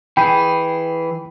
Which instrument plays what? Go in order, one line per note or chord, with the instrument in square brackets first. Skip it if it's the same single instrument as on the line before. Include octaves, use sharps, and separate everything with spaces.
[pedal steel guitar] E3 G#4 [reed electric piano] G5 B5